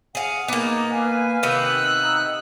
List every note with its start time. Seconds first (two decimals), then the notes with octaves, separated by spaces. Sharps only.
0.15 G#4 F5 F#5
0.48 A#3 B3 D#4 D6
0.91 B4 F5 G#5
1.43 C3 D#3 B3 E6 F#6
2.01 D#4